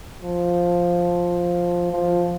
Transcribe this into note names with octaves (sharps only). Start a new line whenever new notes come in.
F3
F3